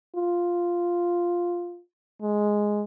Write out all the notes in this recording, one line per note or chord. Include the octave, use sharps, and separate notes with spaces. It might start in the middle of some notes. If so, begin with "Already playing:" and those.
F4
G#3